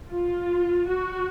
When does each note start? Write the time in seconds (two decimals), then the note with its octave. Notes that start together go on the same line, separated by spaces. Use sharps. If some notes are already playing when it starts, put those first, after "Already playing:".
0.09 F4
0.87 F#4